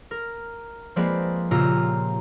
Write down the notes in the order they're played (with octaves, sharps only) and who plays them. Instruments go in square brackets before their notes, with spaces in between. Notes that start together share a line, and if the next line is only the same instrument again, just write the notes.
[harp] A#4
F3 G#3 A#3 C4 B4 D5
A#2 C#3 F4 G4 A#5 E6